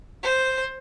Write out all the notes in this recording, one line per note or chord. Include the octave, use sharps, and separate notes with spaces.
C5